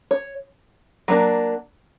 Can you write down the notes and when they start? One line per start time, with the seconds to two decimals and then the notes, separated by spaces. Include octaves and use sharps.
0.11 C#5
1.08 F#3 A#3 D4